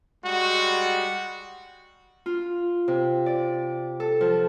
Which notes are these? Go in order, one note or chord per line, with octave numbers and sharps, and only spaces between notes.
G3 G#3 F#4
F4
C3
D5
A4
F3